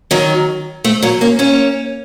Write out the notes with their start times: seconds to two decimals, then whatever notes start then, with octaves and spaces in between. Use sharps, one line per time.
0.11 D#3 F#3
0.84 A3 C4
1.02 F#3 A#3
1.21 A#3 C#4
1.39 A#3 C#4